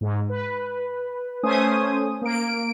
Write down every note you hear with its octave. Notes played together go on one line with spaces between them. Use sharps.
G#2
B4
A3 C#4 C5 G#5 D#6
A#3 D7